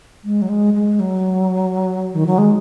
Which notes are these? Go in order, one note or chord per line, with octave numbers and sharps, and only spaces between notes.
G#3
F#3
G#3
G#3
F#3
D#3
F#3
G#3